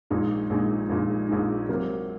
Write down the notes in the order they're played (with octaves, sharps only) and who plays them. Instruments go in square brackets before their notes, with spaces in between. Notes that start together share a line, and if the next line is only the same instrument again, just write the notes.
[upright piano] A#1 A#2 G#3 D#4
A#1 A#2 G#3 D#4
A#1 A#2 G#3 D#4
A#1 A#2 G#3 D#4
C3 F#3 A#3